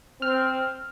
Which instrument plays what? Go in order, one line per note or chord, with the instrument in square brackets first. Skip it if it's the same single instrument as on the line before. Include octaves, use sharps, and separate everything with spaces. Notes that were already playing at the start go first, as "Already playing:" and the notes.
[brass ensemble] C4 [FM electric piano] F6